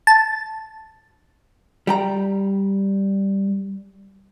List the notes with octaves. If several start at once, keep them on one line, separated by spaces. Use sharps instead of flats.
A5
G3 G5 A#5